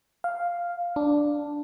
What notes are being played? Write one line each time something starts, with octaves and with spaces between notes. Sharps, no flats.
F5
D4